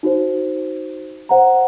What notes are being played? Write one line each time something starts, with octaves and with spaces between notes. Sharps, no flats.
D#4 F#4 C5
C5 F#5 A#5